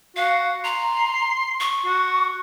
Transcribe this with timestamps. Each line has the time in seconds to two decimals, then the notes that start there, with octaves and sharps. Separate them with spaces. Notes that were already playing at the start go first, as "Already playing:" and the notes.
0.16 F#4 F5
0.64 A#5 C6
1.60 C#6
1.86 F#4